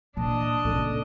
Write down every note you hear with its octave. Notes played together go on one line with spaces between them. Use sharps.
A#2 E3 D4 D#5 A5
A#2 C#3 A4